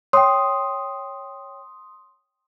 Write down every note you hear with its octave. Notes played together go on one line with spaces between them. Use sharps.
C#5 G5 C6 D#6